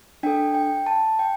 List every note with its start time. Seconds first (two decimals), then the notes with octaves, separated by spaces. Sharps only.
0.23 D4 A4 G5
0.55 G5
0.86 A5
1.19 G5